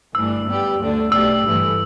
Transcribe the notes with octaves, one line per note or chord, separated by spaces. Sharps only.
G1 G2 E3 A3 D4 E6
G2 G3 B3 G4
D2 D3 A3 D4
B1 B2 A3 D4 G4 E6
G1 G2 E3 A3